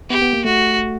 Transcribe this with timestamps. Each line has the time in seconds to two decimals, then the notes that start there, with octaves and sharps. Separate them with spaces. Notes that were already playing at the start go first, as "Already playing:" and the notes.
0.10 B3 G4
0.22 B3
0.33 A#3
0.45 A3 F#4